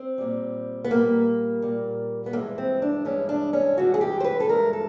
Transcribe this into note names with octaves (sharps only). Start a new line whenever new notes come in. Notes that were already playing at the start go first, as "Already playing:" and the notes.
Already playing: C4
A#2 G3
B3
A#2 G3 A#3
A#2 G3
B3
G2 E3 G#3 A#3
C4
D4
G2 E3 G#3 C#4
D4
C#4
G2 E3 G#3 F#4
G#4
G4
C5
B4
A4
G2 E3 G#3 A#4
A4